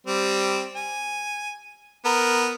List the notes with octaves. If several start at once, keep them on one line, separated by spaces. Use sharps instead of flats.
G3 C4
G#5
B3 A#4